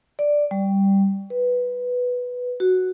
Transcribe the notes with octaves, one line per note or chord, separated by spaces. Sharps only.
D5
G3
B4
F#4